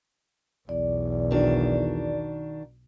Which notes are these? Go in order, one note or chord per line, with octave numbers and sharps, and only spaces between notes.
B1 E2 D5
D#3 D4 F#4